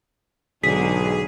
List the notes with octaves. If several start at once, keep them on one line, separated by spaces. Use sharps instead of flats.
B1 G#2 D3 F#3 G#4 B6